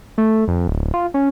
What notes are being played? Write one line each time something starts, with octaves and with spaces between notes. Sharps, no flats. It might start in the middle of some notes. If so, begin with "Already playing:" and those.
A3
F2
D1
F4
C#4